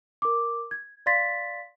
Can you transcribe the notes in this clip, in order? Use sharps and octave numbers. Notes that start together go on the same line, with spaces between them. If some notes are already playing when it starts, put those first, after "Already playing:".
A#4 D6
G#6
D5 F5 C6 A6 B6